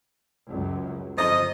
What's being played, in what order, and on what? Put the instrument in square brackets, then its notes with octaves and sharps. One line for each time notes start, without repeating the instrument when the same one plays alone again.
[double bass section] C#2 F#2 F#3
[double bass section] G1 [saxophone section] F2 D#5